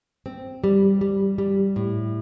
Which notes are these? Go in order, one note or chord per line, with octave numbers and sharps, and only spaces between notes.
C4
G3
G3
G3
A2